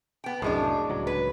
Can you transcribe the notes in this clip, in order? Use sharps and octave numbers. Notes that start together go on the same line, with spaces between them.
B3 G5
C2 F#2 A2 G#3 D4
D1 C#2 F#3
B4